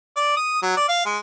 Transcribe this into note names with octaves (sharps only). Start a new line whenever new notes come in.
D5
D#6
F#3
D5
F5
G#3